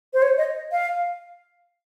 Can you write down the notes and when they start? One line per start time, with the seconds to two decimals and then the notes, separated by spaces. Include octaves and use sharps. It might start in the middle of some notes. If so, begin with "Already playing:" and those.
0.14 C5
0.22 C#5
0.38 D#5
0.72 F5